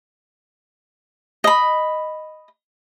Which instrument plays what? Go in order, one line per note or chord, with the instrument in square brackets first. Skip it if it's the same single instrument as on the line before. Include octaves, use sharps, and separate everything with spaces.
[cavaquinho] D#5 B5